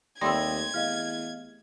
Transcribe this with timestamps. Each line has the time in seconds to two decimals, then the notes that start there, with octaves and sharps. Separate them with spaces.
0.21 D#2 G3 A3 C4 C6 D#6 G#6 A#6
0.74 E2 D#5 F5 F6